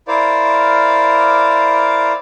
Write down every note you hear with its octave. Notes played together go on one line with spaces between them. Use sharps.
E4 A#4 C5 D5 F5